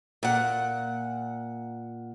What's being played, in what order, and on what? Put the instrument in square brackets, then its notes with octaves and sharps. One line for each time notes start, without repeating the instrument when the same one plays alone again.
[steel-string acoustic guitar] A#2 F#5